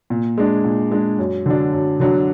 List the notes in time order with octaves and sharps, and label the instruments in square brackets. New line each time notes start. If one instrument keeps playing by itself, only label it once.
[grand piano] A#2
G#3 D4
A#2
G#3 D4
F#2
D3 F#3 D4
F#2
D3 F#3 D4